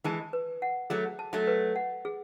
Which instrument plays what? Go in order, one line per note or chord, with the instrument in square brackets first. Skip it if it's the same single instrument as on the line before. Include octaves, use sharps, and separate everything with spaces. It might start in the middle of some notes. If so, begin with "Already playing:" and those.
[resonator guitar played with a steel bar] E3 G#3 [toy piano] A5
[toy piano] B4
F#5
[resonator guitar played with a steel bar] F#3 A3 [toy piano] G#4
[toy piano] A5
[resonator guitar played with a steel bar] F#3 A3
[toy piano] B4
F#5
G#4